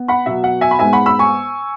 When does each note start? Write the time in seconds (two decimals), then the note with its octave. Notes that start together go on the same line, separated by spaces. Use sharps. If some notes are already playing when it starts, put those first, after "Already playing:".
Already playing: B3
0.08 F#5 B5
0.26 B2 F#3 B3 E5
0.44 F#5
0.61 E5 G#5
0.71 B5
0.79 G#2 G#3 B3 E5 G#5
0.93 F#5 B5
1.06 B5 E6
1.19 G#5 C#6